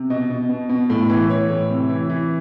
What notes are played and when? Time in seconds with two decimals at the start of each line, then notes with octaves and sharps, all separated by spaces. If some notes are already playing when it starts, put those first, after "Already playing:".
Already playing: C3
0.10 B2 D#5
0.30 B2
0.49 B2
0.69 B2
0.90 A2
1.10 E3
1.30 E3 C#5
1.50 A2
1.70 C3
1.89 E3
2.10 E3